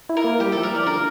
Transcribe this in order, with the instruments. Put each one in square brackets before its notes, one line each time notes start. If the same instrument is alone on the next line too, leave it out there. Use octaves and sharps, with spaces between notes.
[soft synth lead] E4
[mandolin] A#4
[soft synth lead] A#3
[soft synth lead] G3 [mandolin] G4
[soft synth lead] F3 [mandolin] A4
[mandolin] A#4
[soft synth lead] E3 [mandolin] D5
[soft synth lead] D3 [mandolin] A#4